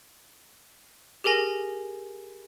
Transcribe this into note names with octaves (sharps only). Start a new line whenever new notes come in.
G4 G#4 A#4 G#5 A#6